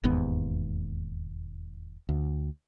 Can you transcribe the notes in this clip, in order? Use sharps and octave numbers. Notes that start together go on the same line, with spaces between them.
E1 D#2 G#2 B3
D2